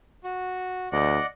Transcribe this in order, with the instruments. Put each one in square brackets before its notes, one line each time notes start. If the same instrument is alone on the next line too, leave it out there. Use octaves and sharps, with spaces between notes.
[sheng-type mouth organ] F#4
[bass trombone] D2 [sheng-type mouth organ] D5 D#5 F#5